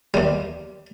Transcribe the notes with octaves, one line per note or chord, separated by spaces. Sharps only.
D#2 G3